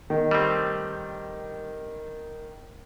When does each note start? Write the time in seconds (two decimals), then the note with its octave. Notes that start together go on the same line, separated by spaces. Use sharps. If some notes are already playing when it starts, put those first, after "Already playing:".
0.10 D#3
0.31 G3 A3 C4